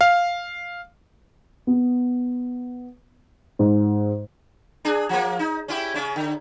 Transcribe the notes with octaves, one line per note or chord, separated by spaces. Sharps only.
F5
B3
G#2
D4 G#4
F3 A#3
D#4
C#4 E4 G4
C#3 C#4
D3